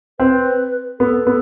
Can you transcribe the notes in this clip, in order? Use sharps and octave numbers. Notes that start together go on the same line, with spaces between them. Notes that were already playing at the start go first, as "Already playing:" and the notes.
C4 B4
B3 A4
B3